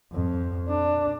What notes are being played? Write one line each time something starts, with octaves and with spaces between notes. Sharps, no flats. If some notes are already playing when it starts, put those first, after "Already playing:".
F2
D4